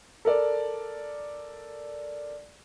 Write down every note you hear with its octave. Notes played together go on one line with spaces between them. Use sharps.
A4 A#4 D5